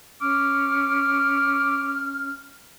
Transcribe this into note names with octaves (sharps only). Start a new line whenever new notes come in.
C#4 D6 F6